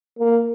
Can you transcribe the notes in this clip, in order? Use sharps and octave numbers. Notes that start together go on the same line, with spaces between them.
A#3